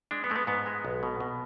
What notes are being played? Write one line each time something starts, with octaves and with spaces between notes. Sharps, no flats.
G#3 D4
B3
G#3 A3
B3
G#2 B3
G#3
B1
B2
B2